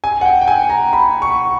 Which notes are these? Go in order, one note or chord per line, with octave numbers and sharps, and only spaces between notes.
G#5
F#5
G5
G5
G#5
A#5
B5
C#6